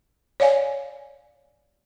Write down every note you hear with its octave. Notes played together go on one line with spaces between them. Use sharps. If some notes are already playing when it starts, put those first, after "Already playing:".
C#5 D5 F5 G#5